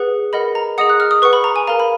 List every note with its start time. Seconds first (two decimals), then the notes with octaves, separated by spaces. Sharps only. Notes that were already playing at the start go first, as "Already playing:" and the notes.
Already playing: G#4 B4 F#5
0.33 A#4 D#5 F#5 B5
0.55 A#5
0.78 G#4 D#5 F#5 D#6
0.89 F#6
1.00 F6
1.11 D#6
1.22 B4 F#5 C#6
1.33 B5
1.44 A#5
1.56 G#5
1.67 A#4 F5 A#5
1.80 B5